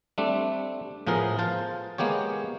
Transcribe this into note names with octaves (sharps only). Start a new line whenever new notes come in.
G3 A3 C4 D4
A2 F3 B3 G#4 A#4
F4 C5 A5
G#3 A#3 B3 G4 C#5